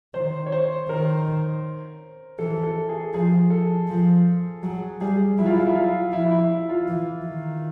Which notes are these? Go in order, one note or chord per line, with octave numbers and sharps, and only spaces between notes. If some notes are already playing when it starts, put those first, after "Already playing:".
D#3 C5
C#5
C5
D#3 A#4
E3 A4
A4
G#4
F3 G#4
A4
F3
F#3 G#4
G3 G#4
F#3 E4
F4
E4
F4
E4
F4
F3 E4
E4
E4
F4
E3
D#3